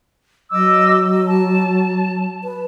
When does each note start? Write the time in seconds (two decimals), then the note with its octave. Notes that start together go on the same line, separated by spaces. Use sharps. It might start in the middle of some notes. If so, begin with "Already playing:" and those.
0.52 F#3 D#5 D6 E6
1.26 A5
2.44 B4